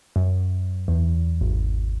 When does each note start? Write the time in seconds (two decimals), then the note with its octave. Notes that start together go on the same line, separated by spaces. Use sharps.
0.16 F#2
0.88 E2
1.41 G#1